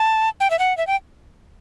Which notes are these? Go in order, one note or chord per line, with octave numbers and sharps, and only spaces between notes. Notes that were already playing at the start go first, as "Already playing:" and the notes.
Already playing: A5
G5
E5
F#5
E5
G5